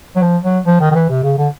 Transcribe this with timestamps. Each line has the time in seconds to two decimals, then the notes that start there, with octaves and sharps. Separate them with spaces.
0.16 F#3
0.22 F3
0.44 F#3
0.66 F3
0.80 D#3
0.91 D#3
0.95 E3
1.10 C3
1.24 C#3
1.38 D3